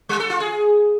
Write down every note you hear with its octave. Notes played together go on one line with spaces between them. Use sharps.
G3
A4
F4
G#4